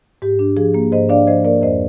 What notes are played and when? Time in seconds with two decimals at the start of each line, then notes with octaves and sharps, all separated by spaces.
0.22 G#2 G4
0.39 D4
0.57 F3 G#4
0.74 A#3
0.92 G#2 C5 D#5
1.09 D4 D5 F5
1.27 F3 C5 D#5
1.45 A#3 A#4 D5
1.62 F2 C5 D#5